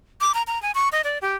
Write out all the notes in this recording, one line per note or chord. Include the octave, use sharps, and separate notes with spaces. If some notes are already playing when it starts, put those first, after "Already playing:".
D6
A#5
A#5
G#5
C#6
D#5
D5
G4